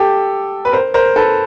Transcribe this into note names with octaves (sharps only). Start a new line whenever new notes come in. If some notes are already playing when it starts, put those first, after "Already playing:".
Already playing: G4 A4
B4
A#4 C5
A#4 C5
A4 B4